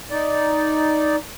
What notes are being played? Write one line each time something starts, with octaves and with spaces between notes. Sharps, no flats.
D#4 D5